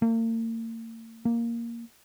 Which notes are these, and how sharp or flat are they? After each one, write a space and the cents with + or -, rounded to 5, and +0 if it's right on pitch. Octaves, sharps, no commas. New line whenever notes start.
A#3 -45
A#3 +0